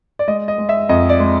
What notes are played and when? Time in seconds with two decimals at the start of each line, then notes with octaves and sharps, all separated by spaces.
0.19 D5
0.28 G#3 D#5
0.48 D#5
0.58 G#3
0.69 E5
0.89 F2 D#5
1.09 D5
1.20 G#3